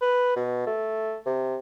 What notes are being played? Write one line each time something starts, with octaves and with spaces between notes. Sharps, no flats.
B4
B2
A3
C3